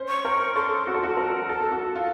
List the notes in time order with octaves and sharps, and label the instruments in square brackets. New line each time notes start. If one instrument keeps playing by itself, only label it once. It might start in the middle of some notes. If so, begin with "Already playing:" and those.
Already playing: [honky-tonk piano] C#4 C5
[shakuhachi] C#6
[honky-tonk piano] A#4
[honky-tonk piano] A4 [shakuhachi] C6
[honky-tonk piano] F#4
A4
[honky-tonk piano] F#4 [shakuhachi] A5
[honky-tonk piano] A#4
[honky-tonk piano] A4 [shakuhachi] A5
[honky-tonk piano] F#4
[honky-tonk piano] F4 [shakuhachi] F5